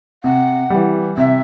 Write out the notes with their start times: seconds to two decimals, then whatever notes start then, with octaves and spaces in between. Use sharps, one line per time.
0.24 C3 F#5
0.70 E3 G3
1.17 C3 E5